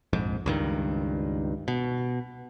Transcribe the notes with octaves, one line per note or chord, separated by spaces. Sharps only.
A#1 F2 G#2
C#2 G2 D#3
B2